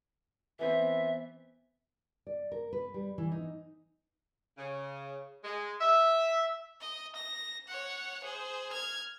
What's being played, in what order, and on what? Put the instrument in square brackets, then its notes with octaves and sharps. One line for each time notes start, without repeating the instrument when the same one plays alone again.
[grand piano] E3 B3 C4 [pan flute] E5
[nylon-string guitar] D5
A#4
B4
G3
E3
D#4
[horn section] C#3
G#3
E5
[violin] D#5
A#6
C#5 F#5
G#4 C5
F6 G#6